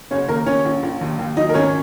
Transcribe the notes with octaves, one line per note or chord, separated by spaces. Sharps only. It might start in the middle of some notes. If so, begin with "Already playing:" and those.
F#1 C#4 C#5
D#2 A#3 A#4
D#2 C#4 C#5
A#1
A#1
D#2
D#2
F#3 D#4 D#5
A#4
G#1 C#4 C#5